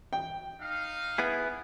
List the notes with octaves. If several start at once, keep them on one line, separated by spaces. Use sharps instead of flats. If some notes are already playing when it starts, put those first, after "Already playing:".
G5
D#4 F5
B3 E4 G#4